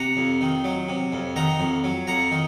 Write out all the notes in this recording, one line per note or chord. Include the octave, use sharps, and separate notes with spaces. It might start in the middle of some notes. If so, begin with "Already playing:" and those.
Already playing: C3 F#5 A#5
F2
D#3
F#3
C3
F2
D#3 F#5 A#5
F2
F#3
F2 F#5 A#5
D#3